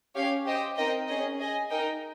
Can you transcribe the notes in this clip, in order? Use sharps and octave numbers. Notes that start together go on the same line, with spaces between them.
C#4 G4 C#5 F5
G4 C5 D#5 G5
C4 D#4 A#4 D#5 G5
C#4 G#4 D#5
G#4 D#5 G#5
D#4 A#4 D#5 G5